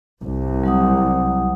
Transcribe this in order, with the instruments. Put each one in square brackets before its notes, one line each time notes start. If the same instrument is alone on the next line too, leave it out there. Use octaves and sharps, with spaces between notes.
[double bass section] C2
[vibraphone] F#3 F#5 D#6